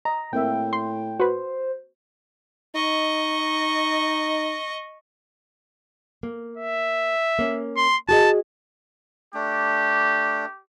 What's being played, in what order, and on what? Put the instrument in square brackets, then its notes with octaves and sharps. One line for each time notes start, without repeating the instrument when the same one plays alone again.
[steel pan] D#5 [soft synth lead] A#5
[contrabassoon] A2 [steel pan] A#3 C4 E5 [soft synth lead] G5
[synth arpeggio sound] C6
[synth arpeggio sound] F#4 B4 [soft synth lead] C5
[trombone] D#4 [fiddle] D#5 C#6
[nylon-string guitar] A#3
[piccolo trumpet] E5
[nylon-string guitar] A#3 C#4
[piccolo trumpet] C6
[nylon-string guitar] F#4 G#4 D#5 [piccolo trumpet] A5
[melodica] A3 D4 [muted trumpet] G4